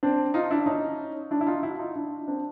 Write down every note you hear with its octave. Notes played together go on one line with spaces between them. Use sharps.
C4 D4
D#4 F4
D4 E4
C#4 D#4
D4 E4
E4
D#4 F4
E4 F#4
D#4 F4
D4 E4
C4 D4